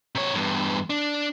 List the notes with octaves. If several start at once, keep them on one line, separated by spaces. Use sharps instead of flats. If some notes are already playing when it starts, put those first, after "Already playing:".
C3 C#5
E2 G2
D4